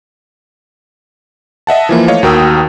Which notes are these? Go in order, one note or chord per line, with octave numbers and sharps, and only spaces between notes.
D#5 E5 F#5 A5
E3 F3 A#3
A3 C#5 D#5 F5
D#2 F#4 A#4 G5 D#6 E6